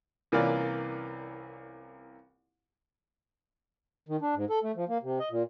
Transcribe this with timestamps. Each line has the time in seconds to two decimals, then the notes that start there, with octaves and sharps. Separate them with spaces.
0.32 C2 E3 A#3 C#4 F4 D5
4.09 D#3
4.21 D4
4.36 G#2
4.50 A4
4.63 A3
4.76 F3
4.89 A#3
5.03 C3
5.19 D#5
5.31 A#2